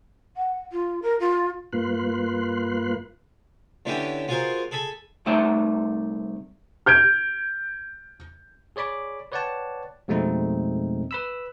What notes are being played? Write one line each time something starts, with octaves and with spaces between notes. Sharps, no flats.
F#5
F4
A#4
F4
G2 A#3 F4 B4 C6 F#6
D3 E3 B3 C#4 E4 G4
B3 F4 F#4 G#4 A#4 C5
G#4 A4 G#5 B5
C2 A3 D#4 D5 E5 G5
F6 G6 G#6 D7
G#4 C#5 D5 B5 D6
B4 C#5 D5 F#5 G5 A5
F2 B2 G#3 A3 C4 D#4
B4 B5 E6